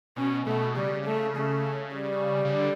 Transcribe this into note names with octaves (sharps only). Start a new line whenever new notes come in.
B2 C#4
B2 A3
C#3 G3
A3
A3
G3
C#3
D3